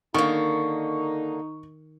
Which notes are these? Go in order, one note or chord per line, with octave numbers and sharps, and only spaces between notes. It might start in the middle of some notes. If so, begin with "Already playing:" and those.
D3 D#3 A#3 D#4 C#6